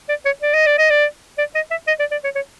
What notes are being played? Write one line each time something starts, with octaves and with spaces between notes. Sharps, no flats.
D5
C#5
D5
D#5
D5
D#5
D5
D5
D#5
E5
D#5
D5
D5
C#5
C#5